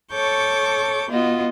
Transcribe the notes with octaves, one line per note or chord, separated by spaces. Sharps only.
A4 C#5 C#6 D6 G6
B3 F4 F#4 D#5